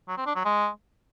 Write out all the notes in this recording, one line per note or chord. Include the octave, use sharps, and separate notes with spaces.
F#3
C4
D4
F#3
G#3